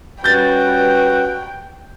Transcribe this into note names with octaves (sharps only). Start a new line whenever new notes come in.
G3 C#4 F#4 B4 G5 G6 A6